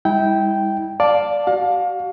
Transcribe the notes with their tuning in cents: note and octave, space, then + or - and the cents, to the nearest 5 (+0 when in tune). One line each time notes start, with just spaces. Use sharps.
G#3 -45 E4 -35 G5 -10
D5 +0 F5 +10 A5 +0
F#4 +35 F5 +30